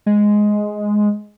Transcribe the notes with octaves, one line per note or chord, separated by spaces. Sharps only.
G#3